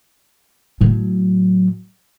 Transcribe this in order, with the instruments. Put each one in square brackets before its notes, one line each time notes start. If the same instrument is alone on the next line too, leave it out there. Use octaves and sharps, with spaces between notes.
[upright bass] A2 F#3